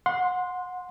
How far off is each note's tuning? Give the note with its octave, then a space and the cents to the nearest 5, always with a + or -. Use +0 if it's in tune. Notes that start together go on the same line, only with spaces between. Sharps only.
F#5 -30 C6 +0